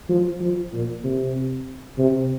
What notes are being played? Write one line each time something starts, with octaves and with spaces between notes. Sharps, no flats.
F3
F3
A#2
C3
C3